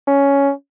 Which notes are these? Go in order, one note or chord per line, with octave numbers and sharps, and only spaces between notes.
C#4